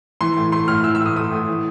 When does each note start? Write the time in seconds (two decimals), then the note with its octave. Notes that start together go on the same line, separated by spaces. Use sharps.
0.21 E3 C6
0.37 A2
0.52 A3 C6
0.68 A2 F6
0.84 E3 E6
0.95 E6
1.01 A2
1.06 D#6
1.16 A3 D#6
1.32 A2
1.47 E3